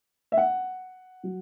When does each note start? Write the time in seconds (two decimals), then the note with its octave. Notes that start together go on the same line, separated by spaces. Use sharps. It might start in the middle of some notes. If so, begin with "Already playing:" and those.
0.32 E5
0.37 F#5
1.23 F#3